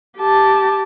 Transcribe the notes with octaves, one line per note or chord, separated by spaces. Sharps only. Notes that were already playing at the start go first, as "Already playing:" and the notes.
G4 A5